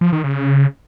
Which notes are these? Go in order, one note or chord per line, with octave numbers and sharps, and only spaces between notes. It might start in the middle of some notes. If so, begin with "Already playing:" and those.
F3
D#3
C#3